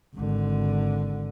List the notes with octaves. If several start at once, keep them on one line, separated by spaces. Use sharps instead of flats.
G#1 D3